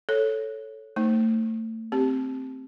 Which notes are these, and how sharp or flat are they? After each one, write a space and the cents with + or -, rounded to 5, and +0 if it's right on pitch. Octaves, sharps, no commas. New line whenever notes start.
A4 +0 C#5 +0
A3 +30 D#4 +0 C5 +15
C4 +0 G4 +0